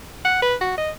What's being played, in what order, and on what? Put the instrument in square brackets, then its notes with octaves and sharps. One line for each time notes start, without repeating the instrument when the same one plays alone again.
[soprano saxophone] F#5
B4
F#4
D#5